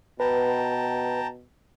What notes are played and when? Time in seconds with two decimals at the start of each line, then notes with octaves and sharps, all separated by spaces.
0.20 B2 B4 G5 A5 A#5